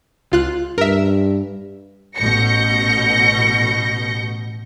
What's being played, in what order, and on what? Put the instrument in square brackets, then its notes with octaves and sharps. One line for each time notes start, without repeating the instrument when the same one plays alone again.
[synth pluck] C#2 F4 F#6
[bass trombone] G2 [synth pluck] A#4 E5
[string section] A1 B2 G6 A#6 C#7